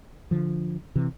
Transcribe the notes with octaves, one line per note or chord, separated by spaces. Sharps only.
D3 F3
C3 E3